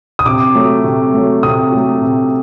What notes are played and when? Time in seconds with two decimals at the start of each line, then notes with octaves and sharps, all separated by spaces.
0.19 D#6
0.26 C3 D6
0.55 F#3 A3
0.84 C3
1.14 F#3 A3
1.43 C3 D#6
1.72 F#3 A3
2.02 C3